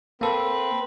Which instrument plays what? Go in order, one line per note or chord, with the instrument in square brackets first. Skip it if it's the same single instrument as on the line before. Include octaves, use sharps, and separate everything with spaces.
[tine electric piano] A#3 A4 [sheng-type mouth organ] C4 B4